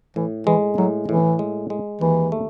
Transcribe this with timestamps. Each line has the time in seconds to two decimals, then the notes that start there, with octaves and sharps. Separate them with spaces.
0.16 A2 E3
0.47 E3 G#3
0.78 A2 F#3
1.08 A2 E3
1.39 G#3
1.70 G#3
2.01 D#2 E3
2.32 A3